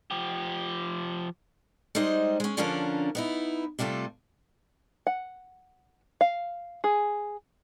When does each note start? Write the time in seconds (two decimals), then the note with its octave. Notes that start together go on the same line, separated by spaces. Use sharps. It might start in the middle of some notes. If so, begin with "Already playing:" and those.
0.11 F3 G4
1.95 G3 G#3 D#4 C5 D#5
2.40 G#3 C#4
2.57 D3 F3 C#4 D4 F4 A#4
3.15 B3 D#4 E4
3.79 C3 G3 A3 F4 A4
5.07 F#5
6.21 F5
6.84 G#4